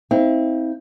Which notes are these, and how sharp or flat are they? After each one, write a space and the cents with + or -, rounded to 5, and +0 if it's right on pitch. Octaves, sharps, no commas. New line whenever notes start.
C4 +0 E4 -45 F5 -35